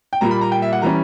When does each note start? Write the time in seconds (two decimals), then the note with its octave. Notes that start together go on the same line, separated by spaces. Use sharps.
0.13 G5
0.21 A#2 G3 A#3 A#5
0.31 B5
0.41 A#5
0.52 G5
0.62 E5
0.73 F#5
0.82 E3 G3 C#4 A#5